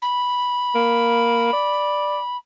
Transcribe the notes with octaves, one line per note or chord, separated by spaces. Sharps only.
B5
A#3
D5